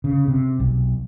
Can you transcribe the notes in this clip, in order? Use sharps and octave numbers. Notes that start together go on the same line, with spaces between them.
C#3
C3
B1